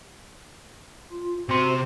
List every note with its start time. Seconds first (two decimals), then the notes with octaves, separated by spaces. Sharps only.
1.11 F4
1.49 C3 C4 F#4 C5 C6